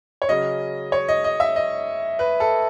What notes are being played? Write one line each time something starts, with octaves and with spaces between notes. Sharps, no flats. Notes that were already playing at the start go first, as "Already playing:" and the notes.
C#5
C#3 F#3 C#4 D#5
C#5
D#5
D#5
E5
D#5
B4
A4